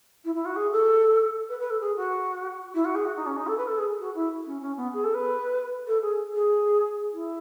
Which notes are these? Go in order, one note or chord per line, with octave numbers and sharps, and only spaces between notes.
E4
E4
F#4
G#4
A4
B4
B4
A4
G#4
F#4
E4
F#4
G#4
F#4
D#4
C#4
D#4
A4
B4
A4
G#4
F#4
E4
C#4
C#4
B3
G#4
A4
B4
A4
G#4
G#4
E4